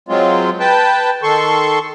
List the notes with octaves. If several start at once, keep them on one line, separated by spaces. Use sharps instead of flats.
F#3 G#3 C4 F4
B4 G5 A5
D#3 A4 C6 C#6